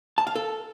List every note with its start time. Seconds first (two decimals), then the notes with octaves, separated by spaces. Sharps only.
0.18 A5
0.27 F5
0.35 A4